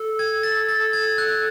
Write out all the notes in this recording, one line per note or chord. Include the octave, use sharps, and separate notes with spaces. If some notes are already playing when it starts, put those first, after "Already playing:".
Already playing: A4
G#6
A6
A6
G#6
F#6